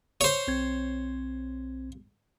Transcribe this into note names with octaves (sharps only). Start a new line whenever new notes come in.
C5 C#5
B1 C4 G#6